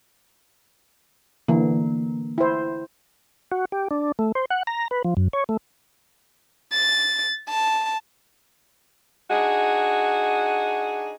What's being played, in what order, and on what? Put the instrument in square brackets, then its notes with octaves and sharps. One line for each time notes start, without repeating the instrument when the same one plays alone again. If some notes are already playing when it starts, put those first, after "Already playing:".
[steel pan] D3 E3 [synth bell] A#3
[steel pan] E4 C5
[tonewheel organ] F#4
G4
D4
A3
C5
F#5
A#5
B4
F3
F#2
C#5
A3
[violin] A6
A5
[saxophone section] D4 D#4 F#4 G#4